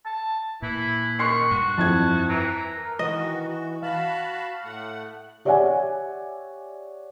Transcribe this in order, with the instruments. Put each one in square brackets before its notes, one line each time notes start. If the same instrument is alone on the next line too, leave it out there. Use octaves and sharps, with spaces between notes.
[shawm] A5
[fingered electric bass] A#2 [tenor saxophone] E3 [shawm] E4
[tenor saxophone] D#3 [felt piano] C6 F#6 C7 [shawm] C#6
[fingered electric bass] G2 [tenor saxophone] F#4
[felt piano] F2 E4 G#6 [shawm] A5
[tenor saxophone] E3 [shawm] A#5
[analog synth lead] A#4
[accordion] D#3 F#4 [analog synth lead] E3 [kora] D#5
[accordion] F#4
[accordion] F#4 A5 B5 [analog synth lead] F5
[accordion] A2 A3 F#5
[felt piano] G4 C#5 D5 E5 F#5 G#5